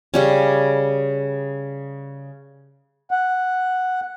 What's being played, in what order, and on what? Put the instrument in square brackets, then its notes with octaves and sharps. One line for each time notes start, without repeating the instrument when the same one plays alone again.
[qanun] C#3 G3 C#4
[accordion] F#5